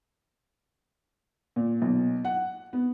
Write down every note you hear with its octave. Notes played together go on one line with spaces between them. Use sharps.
A#2
B1
F#5
B3